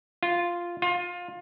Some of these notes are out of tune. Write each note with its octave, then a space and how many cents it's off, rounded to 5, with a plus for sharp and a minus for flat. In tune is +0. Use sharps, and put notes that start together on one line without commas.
F4 -5
F4 +20